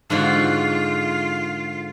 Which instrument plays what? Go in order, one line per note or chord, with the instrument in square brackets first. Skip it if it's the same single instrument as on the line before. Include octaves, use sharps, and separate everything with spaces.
[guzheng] G#2 D3 F#4 [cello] F4